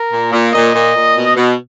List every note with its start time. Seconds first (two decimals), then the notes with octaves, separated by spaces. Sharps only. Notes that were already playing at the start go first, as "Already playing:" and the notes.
Already playing: A#4
0.12 A#2
0.32 A#2
0.53 A#2 D#5
0.73 A#2
0.94 A#2
1.15 B2
1.35 B2